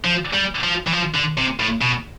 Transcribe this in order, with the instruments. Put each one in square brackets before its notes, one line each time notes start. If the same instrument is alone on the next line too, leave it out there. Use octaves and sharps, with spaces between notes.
[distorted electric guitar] F3
G3
F3
E3
F3
D3
C3
A2
B2